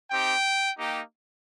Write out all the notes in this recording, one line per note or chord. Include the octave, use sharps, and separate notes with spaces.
C4 D#4 G4 G5
A#3 D#4 G4